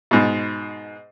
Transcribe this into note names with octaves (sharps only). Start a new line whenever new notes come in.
G#2 B2